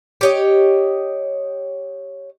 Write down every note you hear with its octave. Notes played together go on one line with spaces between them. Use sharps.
G4 C#5 D#5